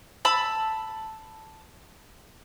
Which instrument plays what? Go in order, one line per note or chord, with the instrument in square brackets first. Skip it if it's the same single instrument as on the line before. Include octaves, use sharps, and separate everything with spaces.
[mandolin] A5 B5 E6